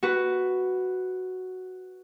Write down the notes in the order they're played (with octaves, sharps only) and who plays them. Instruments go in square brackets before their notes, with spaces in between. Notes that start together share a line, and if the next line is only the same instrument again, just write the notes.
[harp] F#4 B4